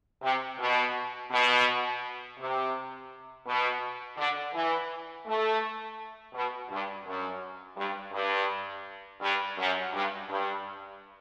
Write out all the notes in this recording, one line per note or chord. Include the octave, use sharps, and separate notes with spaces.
C3
B2
B2
C3
B2
D3
E3
A3
B2
G2
F#2
G2
G2
G2
F#2
G2
G2